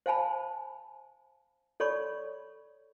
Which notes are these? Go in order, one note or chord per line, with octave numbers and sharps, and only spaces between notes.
C5 F5 G#5 A5 B5
A4 C#5 D5 B5 C#6